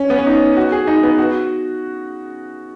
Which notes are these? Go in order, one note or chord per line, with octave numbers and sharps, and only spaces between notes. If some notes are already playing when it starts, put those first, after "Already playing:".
Already playing: C#4
B3
C#4
D#4
F#4
G#4
D#4
B3
F#4